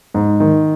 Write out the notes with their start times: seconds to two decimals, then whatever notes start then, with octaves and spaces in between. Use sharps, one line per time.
0.14 G#2
0.40 D#3